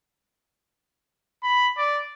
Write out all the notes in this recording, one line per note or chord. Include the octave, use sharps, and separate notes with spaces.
B5
D5